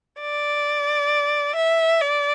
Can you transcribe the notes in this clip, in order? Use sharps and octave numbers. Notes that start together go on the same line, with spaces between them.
D5
E5
D5